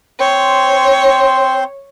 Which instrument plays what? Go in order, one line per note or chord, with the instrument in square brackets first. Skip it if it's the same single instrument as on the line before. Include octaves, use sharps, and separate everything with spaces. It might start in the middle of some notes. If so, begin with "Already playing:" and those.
[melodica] C4 C5 C6 [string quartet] C#5